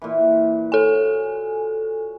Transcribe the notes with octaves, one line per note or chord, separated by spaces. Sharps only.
A#2 E3
F#4 A4 G#5